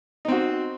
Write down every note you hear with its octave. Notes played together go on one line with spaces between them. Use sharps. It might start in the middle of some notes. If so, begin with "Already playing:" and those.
C4 D#4 F#4